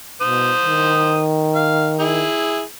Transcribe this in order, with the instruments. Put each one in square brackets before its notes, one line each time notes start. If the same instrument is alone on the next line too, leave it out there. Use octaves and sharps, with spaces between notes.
[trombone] B2 [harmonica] C5 D#6
[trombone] D#3
[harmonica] F5
E4 G#4